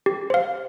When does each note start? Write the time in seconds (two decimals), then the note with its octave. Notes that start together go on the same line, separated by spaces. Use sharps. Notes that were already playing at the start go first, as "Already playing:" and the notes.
0.06 G4
0.30 C5 F5